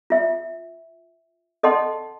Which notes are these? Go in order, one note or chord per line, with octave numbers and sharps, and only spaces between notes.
F4 E5
A4 D#5 F#5 A5 C6